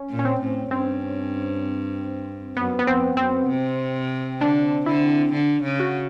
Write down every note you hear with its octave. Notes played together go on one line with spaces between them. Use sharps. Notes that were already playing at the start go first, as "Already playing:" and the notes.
Already playing: C#4
A#2
C#4
C4
A2
G2 C4
F#2 B3
B3
F2 C4
F#2 C4
C3
D3 D4
D3 E4
D3
C#3
F#4